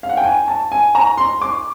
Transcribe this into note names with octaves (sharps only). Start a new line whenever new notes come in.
F5
F#5
G5
G#5
A5
G#5
A#5
C6
D6